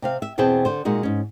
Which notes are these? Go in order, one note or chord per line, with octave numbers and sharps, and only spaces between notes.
C3 C4 F5
E5
E2 B2 C4 G#4 G5 A5
D3 C5
A#2 G#3 D#4 F#4
G#2 C#4